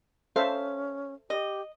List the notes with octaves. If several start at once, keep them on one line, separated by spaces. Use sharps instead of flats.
C#4 A4 C5 E5 F5
G4 D#5